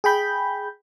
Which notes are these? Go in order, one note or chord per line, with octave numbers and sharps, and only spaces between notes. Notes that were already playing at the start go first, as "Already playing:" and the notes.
G#4 G5 B5 G6